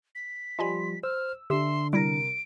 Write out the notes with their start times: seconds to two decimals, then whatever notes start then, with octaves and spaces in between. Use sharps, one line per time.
0.15 B6
0.59 F3 G3 D#5 G#5 B5 C6
1.03 C5 E6 F6
1.50 D3 D4 G4 E5 C6 E6
1.93 C3 G3 E4 A#4 A#6 D7